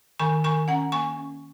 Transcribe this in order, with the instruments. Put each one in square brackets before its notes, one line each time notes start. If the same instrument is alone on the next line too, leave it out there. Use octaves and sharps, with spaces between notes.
[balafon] D#3 G#5 C#6
D#3 G#5 C#6
C#4 F#5 A#5
A#3 G#5 C#6
C#4